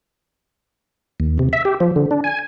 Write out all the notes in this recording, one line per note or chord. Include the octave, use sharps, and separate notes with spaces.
D#2
C3
E5
G4
F3
D3
D4
G#5